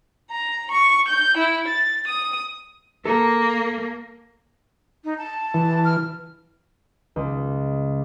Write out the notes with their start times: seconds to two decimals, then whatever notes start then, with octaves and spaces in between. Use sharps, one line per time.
0.31 A#5
0.72 C#6
1.07 G6
1.37 E4
1.68 A6
2.06 D#6
3.05 A#3 A4 A#4
5.04 D#4
5.17 A5
5.54 E3
5.84 F6
7.16 C#2